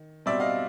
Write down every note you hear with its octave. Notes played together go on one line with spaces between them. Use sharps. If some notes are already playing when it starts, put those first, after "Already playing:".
Already playing: D#3
B2 G3 C4 D5 E5
D#5 F5